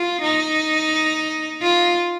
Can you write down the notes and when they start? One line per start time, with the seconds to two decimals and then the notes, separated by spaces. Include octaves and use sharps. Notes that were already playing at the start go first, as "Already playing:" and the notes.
Already playing: F4
0.22 D#4
1.62 F4